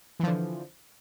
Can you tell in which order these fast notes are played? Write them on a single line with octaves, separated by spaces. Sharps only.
E3 F3 D3